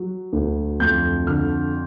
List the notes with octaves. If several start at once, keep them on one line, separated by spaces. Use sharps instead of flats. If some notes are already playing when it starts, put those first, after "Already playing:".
Already playing: F#3
D2
F2 G6
D3 F6